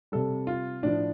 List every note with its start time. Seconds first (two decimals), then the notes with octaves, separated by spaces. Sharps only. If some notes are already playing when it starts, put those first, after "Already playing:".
0.12 C3 G3 A4
0.47 F4
0.83 A2 F3 D4